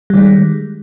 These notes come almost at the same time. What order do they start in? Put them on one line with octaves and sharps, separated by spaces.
G3 D#3 G#3